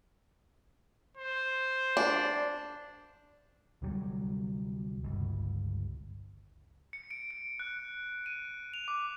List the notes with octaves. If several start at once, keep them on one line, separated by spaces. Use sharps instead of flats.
C5
D4
D2 C3 F#3 G3
G1 C#2
C#7
D7
D7
F#6
D#7
F7
D6